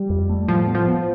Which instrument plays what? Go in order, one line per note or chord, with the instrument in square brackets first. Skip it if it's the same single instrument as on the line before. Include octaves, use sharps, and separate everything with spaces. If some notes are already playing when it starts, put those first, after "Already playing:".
Already playing: [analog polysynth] G3
[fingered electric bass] F2
A3
[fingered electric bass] A2 [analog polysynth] F3
[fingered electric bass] B3
[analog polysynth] F3
[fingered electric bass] B3